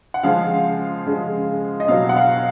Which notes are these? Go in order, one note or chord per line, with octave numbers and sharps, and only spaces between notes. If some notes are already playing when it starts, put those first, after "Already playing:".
F#5
C#3 F3 G#3 F5
C#3 F3 G#3
D#5
B2 F#3 F5
F#5
F5